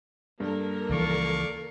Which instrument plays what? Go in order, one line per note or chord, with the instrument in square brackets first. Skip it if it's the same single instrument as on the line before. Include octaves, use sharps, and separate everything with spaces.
[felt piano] G2 [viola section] A#3 A4 A#4
[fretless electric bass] C#2 E3 F3 [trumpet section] D5 F5 C#6